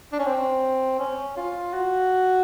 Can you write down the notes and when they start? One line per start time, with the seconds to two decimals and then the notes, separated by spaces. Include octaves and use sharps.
0.12 D4
0.19 C#4
0.26 C4
0.99 C#4
1.37 F4
1.73 F#4